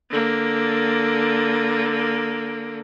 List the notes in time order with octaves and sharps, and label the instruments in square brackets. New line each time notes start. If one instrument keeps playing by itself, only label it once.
[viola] D3 A#3